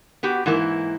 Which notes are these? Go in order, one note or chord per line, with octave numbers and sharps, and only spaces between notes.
B3 F#4 G4
G#2 E3 A#3 E4